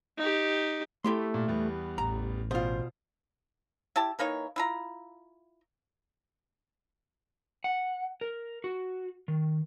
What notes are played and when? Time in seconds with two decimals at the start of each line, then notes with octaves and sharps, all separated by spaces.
0.18 D#4 G4
1.04 A3 E4 G4 C6
1.34 A#2
1.48 E2 G3 B3
1.98 A1 A#5
2.51 B2 F4 C5
3.96 E4 G4 A5
4.19 E3 A#3 D#4 C#5
4.56 E4 F4 A#5
7.64 F#5
8.21 A#4
8.64 F#4
9.28 D#3